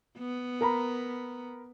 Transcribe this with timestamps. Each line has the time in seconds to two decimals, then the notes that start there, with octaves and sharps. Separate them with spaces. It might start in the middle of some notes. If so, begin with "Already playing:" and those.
0.18 B3
0.61 A#4 A#5 B5